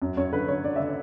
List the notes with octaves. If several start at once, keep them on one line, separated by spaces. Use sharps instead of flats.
F#2
F#2 C#5
D3 B4
D3 C#5
D3 D5
D3 E5
D5